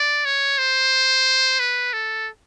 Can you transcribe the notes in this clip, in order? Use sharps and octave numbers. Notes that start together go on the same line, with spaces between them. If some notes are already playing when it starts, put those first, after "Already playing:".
Already playing: D5
C#5
C5
B4
A4